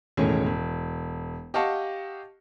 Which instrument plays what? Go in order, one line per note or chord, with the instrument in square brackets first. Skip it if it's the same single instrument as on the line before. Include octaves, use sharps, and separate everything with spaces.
[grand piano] E1 A2 D#3 C#4 G#4 G#5
E1
G4 D#5 F5 F#5 A5 C#6